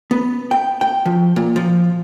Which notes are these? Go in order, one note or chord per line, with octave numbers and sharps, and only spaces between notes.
B3
G5
G5
F3
A#2
F3